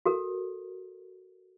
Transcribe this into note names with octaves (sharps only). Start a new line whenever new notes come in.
F#4 A4 A#4